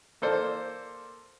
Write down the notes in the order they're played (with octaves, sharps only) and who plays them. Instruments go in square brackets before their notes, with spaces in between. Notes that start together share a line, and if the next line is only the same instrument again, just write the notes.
[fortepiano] A#3 A4 C5 D5